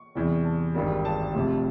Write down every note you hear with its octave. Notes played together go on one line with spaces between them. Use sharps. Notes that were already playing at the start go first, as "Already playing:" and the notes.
Already playing: C#6
E2 C3 E3 G3
A5
G#1 G2 D#3 G3
A5
F1 F2 C3